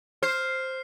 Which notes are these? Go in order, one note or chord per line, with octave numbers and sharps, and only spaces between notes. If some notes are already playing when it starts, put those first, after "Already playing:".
C5 F6 C7